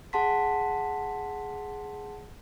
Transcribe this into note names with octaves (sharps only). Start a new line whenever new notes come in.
G#4 F#5 A5 C6 B6